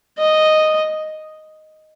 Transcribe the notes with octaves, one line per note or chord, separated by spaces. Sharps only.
D#5